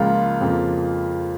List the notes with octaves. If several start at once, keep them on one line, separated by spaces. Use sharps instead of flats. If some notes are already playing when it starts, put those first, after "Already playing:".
Already playing: C#2 C#3 F3 A#3 F4
F2 C#3 F3 A#3